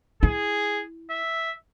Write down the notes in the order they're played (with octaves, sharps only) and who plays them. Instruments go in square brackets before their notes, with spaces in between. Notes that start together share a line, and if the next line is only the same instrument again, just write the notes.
[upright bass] E4 [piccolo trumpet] G#4
[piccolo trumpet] E5